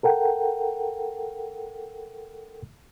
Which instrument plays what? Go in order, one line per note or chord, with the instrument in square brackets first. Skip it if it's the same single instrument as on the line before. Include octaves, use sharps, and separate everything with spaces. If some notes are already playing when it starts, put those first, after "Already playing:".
[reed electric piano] A4 A#4 F#5 G5